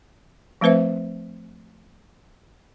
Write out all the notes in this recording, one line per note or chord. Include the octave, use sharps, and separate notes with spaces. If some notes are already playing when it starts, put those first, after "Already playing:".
F3 A3 C4 B4 C5 E5